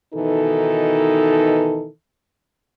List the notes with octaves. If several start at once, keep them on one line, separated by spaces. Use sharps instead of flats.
B2 D#3 E3 D#4 A4